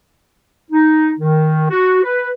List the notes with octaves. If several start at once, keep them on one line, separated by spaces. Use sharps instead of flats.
D#4
D#3
F#4
B4